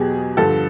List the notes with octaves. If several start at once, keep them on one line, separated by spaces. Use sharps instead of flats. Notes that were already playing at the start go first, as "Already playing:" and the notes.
Already playing: E2 B2 F#3 G4 G#4
G2 D3 F3 A4